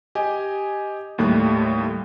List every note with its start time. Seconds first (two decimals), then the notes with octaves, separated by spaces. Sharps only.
0.15 G4 D#5 G#5
1.18 D#2 A2 G3 A3 F#6